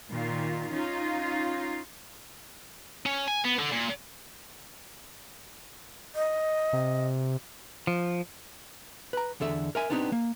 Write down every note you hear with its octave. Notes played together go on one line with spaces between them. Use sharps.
A#2 D#3 F4
C#4 D#4 F4
C#4
G#5
B3
D3
A#2
D#5
C3
F3
B4 A#5
E2 D3 A4 E5
A#4 E5 G#5
B3 C4 D4 D#4 F4 G4
A#3